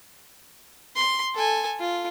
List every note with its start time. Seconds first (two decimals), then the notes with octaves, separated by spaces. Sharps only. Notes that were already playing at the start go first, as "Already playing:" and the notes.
0.96 C6
1.35 A4 G#5
1.80 F4